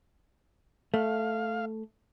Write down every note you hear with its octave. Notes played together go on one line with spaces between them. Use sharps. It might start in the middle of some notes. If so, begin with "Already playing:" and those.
A3 F5